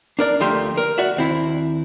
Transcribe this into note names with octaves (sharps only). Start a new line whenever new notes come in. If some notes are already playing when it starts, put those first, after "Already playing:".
D4 A#4 D5
D2 F3 A3 A#3 G4 C6
A#4
F#4 D5 E5
D#2 C4 E4